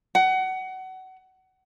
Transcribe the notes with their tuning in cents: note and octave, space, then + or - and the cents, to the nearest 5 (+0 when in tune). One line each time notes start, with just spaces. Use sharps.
F#5 +25